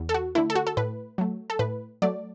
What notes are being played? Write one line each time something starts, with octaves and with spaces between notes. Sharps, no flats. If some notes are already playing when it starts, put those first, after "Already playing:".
Already playing: E2
A4
F#4
D3 A3 E4
A4
F#4
A4
A2 B4
F#3 A3
A4
A2 B4
F#3 A3 D5